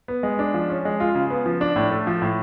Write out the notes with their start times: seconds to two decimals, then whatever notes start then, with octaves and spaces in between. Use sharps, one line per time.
0.08 B3
0.23 G#3
0.39 D4
0.54 F3
0.69 C#4
0.85 G#3
1.00 F4
1.15 C#3
1.30 B3
1.46 F3
1.61 D4
1.76 A2
1.91 A3
2.07 F3
2.22 A2